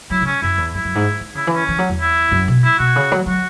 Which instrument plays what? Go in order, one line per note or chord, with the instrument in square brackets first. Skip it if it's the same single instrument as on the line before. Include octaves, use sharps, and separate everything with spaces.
[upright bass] F#3 [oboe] E4
[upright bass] C#3
[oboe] C#4
[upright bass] F#2 [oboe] E4
[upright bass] E2
[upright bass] F#2 [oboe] E4
[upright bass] F#2
G#2
E3
[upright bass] C#3 [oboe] E4
[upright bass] E3
[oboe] C#4
[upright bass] E3
F#3
E2
[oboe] E4
[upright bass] F#2
B2
[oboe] E4
[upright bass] B2 [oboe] F#4
[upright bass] C#3
F#3
[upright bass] F#3 [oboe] F#4